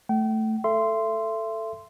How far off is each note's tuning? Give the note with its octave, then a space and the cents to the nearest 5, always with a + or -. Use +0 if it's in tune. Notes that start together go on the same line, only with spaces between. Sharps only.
A3 +0 G5 -40
A4 +5 E5 +30 C6 -10